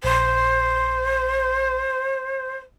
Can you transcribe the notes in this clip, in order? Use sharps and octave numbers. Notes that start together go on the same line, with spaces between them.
A#1 C5